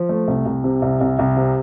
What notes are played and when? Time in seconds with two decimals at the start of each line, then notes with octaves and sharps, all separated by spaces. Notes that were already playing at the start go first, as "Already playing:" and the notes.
Already playing: F3
0.09 A3
0.28 C2
0.46 C2
0.64 C3
0.82 C2
1.01 C2
1.19 C2
1.37 C3